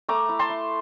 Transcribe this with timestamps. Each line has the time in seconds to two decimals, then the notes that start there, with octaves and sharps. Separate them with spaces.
0.08 A3 A#5 D6
0.29 E4
0.39 A5 C6
0.49 E4